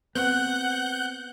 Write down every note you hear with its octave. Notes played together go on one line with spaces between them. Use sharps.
B3 C4 F#5 F#6 G6